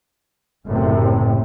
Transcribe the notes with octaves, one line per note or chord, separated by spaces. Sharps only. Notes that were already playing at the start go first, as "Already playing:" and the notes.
F#1 A2 C3